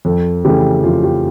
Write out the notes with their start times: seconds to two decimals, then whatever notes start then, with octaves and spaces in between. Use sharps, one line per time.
0.05 F2 A4
0.44 C#3 E3 A3 G4
0.84 F2 F4
1.03 G4